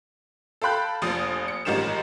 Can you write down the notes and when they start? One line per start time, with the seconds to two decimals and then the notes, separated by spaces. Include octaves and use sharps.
0.62 A4 F5 G5 B5 F#6 G6
1.02 F1 A#1 F3 D#6
1.48 C#7
1.65 A1 G#2 D#3 F3 G3 E7